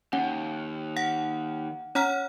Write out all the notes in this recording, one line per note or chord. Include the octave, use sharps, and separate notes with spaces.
D#2 C#4 F#5
F#5 A#6
C#4 C#5 F#5 A#5 F6 B6